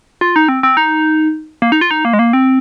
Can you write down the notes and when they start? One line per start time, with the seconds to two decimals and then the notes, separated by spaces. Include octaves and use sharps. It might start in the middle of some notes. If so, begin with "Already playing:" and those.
0.21 F4
0.36 D#4
0.49 C4
0.63 C4
0.77 D#4
1.62 A#3
1.72 D#4
1.81 F4
1.91 D#4
2.05 A#3
2.13 G#3
2.19 A#3
2.33 C4